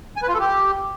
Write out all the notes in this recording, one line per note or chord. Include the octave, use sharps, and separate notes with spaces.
G#5
B4
F4
A4
G4